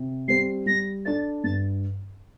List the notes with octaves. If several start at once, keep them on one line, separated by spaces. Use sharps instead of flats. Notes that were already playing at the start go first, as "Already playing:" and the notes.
Already playing: C3
G3 C4 G4 C5 C7
G3 A#6
D4 A4 D5 A6
G2 A6